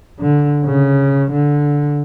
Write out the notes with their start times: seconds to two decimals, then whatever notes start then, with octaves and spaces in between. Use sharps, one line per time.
0.19 D3
0.65 C#3
1.31 D3